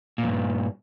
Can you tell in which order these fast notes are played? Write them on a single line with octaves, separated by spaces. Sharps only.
A#2 E2 G2